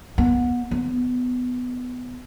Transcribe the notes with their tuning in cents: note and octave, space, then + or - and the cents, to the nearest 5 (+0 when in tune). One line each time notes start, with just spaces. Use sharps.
B3 -25
B3 +15